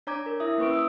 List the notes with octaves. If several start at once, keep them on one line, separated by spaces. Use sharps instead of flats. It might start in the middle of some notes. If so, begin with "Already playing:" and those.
D4 C#5 A#5 D6 G#6
A#4
E4 E5 D#6
A#3 C#4 B4 C#6 D7
D#6 E6